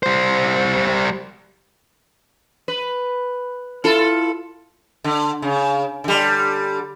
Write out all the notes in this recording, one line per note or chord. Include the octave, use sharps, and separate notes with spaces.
G3 C5
B4
E4 F4 A4
D3
C#3
D3 G3